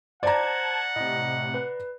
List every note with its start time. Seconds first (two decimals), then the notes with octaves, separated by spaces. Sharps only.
0.23 C5 D5 F#5 A5 A#5 G#6
0.96 A2 C3 D#5
1.54 B4